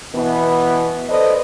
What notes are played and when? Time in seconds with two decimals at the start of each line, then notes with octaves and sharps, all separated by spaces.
0.15 B2 E3 B3
1.09 A4 B4 C5 D5 D#5